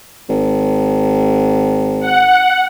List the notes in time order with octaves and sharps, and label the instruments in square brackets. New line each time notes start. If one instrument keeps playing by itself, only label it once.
[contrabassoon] G#1
[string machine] F#5